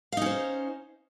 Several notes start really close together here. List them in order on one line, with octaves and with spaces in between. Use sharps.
F5 D#4 C#4 C5